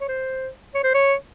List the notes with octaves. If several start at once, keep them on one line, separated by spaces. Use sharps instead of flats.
C#5
C5
C#5
C5
C#5